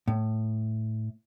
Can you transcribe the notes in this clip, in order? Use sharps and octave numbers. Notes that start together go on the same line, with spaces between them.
A2